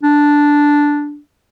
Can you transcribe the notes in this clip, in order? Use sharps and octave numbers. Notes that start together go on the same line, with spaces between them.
D4